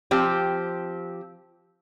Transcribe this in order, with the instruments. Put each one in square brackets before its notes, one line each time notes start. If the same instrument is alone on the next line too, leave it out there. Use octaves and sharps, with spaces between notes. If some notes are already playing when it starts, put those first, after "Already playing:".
[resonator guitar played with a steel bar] F3 C4 G4